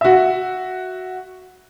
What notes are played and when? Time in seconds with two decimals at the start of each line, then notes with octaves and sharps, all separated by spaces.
0.01 F#4 E5